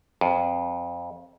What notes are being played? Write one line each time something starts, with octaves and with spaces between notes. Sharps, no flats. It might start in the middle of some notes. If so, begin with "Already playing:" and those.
F2